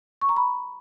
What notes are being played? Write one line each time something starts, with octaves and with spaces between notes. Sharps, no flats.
C#6
A#5
B5